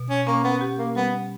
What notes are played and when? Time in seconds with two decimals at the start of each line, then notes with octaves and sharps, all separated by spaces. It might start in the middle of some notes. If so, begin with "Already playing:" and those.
Already playing: B2
0.10 C#4
0.27 A#3 C#4
0.44 B3
0.61 G4
0.78 A#3
0.95 G3 B3